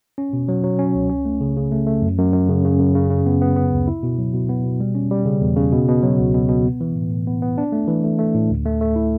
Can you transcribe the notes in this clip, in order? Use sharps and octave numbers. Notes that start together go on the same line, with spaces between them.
C#4
B2
F#3
F#3
C#4
C#2
C#4
A3
C#3
C#3
A3
A3
F#2
F#2
F#2
C#3
C#3
F#2
C#3
C#3
B3
B3
B3
D2
E4
B2
F#3
B2
B3
B2
G3
C#4
G3
C#3
E2
C#3
B2
B2
F#3
C#2
B2
B2
B3
E3
A2
A2
B3
B3
D4
A3
E3
A3
A3
A2
D2
A3
A3
E4